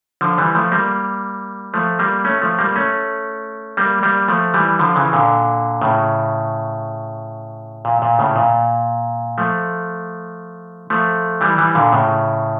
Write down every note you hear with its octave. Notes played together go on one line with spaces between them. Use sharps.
D3 F3
E3 G3
F3 A3
G3 A#3
F3 A3
G3 A#3
A3 C#4
F3 A3
G3 A#3
A3 C#4
G3 A#3
G3 A#3
F3 A3
E3 G3
D3 F3
C#3 E3
A#2 D3
A2 C#3
A#2
A#2
A2 C#3
A#2
F3 A3
F3 A3
E3 G3
E3 G3
A#2 D3
A2 C#3